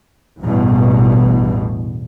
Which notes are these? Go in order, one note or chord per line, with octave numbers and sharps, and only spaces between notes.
A1 E2 G2 B2